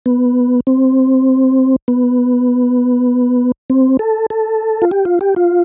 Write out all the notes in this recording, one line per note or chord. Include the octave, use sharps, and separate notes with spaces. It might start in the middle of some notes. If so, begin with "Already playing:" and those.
B3
C4
B3
C4
A4
A4
F4
G4
F4
G4
F4